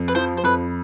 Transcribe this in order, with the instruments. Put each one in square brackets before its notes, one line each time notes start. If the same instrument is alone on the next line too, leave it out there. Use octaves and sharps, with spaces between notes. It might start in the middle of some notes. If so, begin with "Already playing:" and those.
Already playing: [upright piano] F2
[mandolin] B4
[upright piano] F3 [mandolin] C5
[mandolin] C5
[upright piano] F2 [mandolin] B4